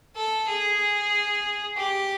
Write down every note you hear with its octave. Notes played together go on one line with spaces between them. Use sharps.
A4
G#4
G4